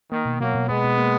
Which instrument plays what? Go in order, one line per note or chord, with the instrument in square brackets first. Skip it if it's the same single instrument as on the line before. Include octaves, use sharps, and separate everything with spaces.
[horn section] D#3 [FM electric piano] A#3
[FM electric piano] B2
[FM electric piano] B2 [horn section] F#3 A#3
[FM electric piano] B2
[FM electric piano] B2 [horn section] G#3 B3
[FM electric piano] B2
A#3